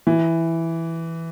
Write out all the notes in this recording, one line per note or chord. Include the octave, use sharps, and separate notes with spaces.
E3